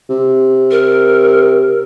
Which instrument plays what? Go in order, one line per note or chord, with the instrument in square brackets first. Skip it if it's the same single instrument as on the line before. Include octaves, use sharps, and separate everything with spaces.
[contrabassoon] C3
[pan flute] A#4